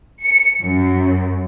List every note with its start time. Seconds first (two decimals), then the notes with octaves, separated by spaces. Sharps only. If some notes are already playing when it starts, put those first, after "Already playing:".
0.22 C#7
0.60 F#2